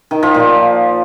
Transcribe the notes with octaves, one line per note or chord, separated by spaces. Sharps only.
D#3
F3
A#2